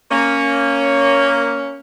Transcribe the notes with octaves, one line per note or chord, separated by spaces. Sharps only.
A#3 C#4